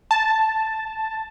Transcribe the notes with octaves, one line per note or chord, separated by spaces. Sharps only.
A5